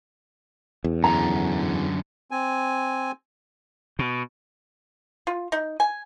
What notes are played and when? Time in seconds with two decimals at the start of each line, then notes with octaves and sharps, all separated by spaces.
0.84 E2
1.04 F#2 D3 A#5
2.31 C4 G#5
3.99 B2
5.27 F4
5.52 D#4
5.80 G#5